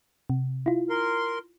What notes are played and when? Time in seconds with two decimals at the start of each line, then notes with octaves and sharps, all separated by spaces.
0.30 C3
0.66 E4 F4
0.90 A#4 C6